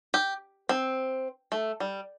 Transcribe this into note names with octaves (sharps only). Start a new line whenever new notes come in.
G4
C4
A3
G3